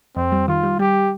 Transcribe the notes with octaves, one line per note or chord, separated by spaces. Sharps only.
F2 C4
G3
D#3 F4
G3
G3 G4